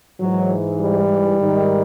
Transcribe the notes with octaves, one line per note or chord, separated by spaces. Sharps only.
G#2 E3 F#3
G3
G#2 D#3